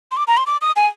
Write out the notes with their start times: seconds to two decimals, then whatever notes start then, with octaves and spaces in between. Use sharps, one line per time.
0.11 C6
0.17 D6
0.28 A#5
0.37 C6
0.47 D6
0.61 D#6
0.76 G#5